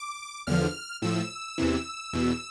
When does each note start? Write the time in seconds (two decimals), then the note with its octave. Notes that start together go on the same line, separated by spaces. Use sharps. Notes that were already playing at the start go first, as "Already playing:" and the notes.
Already playing: D6
0.47 E2 D3 F3 F6
1.02 A2 F3 E6
1.58 E2 C3 E3
2.13 E2 B2